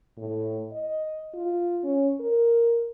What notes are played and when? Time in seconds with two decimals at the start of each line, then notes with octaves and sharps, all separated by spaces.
0.18 A2
0.72 D#5
1.34 F4
1.84 C#4
2.21 A#4